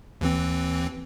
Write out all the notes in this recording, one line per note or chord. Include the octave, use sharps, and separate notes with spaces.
D#2 E3 C4